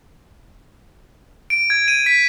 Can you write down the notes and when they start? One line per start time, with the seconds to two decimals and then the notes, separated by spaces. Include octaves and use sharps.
1.50 D7
1.70 G#6
1.88 D#7
2.06 B6